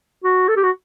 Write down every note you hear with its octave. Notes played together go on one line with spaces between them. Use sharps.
F#4
A4
G4
F#4